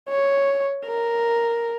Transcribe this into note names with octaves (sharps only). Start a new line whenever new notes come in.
C#5
A#4